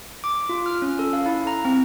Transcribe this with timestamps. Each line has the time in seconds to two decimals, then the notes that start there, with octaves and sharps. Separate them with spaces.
0.24 D6
0.49 F4
0.66 F6
0.82 C#4
0.99 A4
1.13 F5
1.26 E4
1.47 A#5
1.65 C4